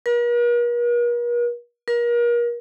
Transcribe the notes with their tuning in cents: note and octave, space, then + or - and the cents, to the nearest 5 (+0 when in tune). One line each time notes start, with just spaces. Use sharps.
A#4 +45
A#4 +35